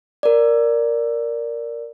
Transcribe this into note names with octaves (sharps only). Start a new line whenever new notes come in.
A#4 D5